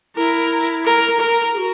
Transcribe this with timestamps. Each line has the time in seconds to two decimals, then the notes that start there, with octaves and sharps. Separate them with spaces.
0.16 E4 A#4
0.85 A#4
1.20 A#4
1.53 G#4
1.58 F#4